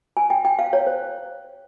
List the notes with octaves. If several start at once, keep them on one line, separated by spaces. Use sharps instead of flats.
G#5
G5
G5
F5
C#5
C5